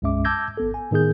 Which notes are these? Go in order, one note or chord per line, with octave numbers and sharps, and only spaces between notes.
B1 F#2 G#3 C#4 E5 D6
A5 D6 E6 G6 G#6 A#6
G#1 B3 A4
G#5
A2 D#3 B3 G#4 G6